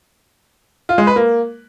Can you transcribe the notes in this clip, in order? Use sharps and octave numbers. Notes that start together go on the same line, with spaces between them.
F4
G#3
B4
A#3